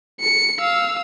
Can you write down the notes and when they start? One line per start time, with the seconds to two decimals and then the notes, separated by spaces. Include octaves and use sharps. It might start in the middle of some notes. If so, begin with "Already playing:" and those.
0.21 C#7
0.60 F5 E6